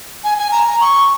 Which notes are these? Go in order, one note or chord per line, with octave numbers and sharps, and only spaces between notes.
G#5
G#5
A#5
A#5
C#6